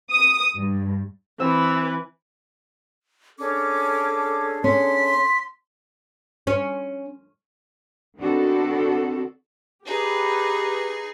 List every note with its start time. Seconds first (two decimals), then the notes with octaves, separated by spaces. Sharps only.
0.11 D#6
0.56 G2
1.40 E3 C4 B4 E6
3.39 C#4 D4 G#4 A4 D6
4.64 C#4 C6 B6
6.47 C#4
8.17 D#3 B3 C4 D4 F#4 A4
9.86 D#4 G4 G#4 B4